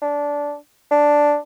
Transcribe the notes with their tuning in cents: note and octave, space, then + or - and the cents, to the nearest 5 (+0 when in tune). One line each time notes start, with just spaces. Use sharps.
D4 -15
D4 +0